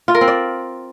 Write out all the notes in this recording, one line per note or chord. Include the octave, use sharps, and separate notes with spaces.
F4
A#4
C4
D5